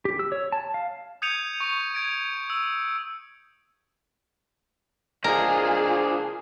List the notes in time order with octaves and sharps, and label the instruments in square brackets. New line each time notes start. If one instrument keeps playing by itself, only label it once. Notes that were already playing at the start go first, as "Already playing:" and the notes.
[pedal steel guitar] G4
E6
C#5
A5
F5
[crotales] D#6 G6 G#6 C#7 D#7 F7
C#6
G#6 D7
E6
[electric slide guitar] D4 C5 D#5 [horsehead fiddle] F4 G#4 [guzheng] A#4